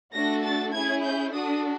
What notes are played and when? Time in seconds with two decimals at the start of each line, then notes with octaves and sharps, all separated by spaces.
0.13 A3 D4 F#4 A4 A#6
0.44 A6
0.73 C#4 E4 G#4 G#6
1.03 G6
1.34 D4 F#4 A4 D#6